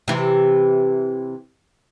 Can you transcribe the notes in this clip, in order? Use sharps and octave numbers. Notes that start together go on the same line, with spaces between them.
C3 E3